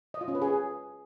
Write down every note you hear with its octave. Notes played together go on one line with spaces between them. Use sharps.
D#5
F4
C#4
B4
G#4